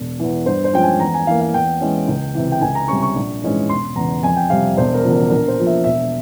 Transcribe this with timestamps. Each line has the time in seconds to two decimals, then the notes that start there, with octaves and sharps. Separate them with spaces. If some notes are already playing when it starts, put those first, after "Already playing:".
Already playing: E1
0.19 E2 E3
0.46 G2 C5
0.64 C5
0.73 F3 G#3 C#4 G5
0.83 G#5
1.00 E2 A#5
1.14 G#5
1.27 E3 A#3 F5
1.41 F5
1.54 E2 G5
1.81 E3 G#3 C#4
2.08 C#2
2.35 C3 E3
2.52 G5
2.61 C#2 G#5
2.75 A#5
2.88 C3 G3 C#4 C#6
3.02 C#6
3.15 A#1
3.43 G#2 E3 G#3 C#4
3.69 E1 C6
3.96 E2 C#3 A#5
4.23 F2 G#5
4.37 G5
4.50 C3 G3 C4 F5
4.77 E1 C5
4.94 A#4
5.03 E2 C#3 F3
5.13 A#4
5.30 A#1 A#4
5.48 C5
5.58 A#2 F3
5.67 E5
5.84 E1 E5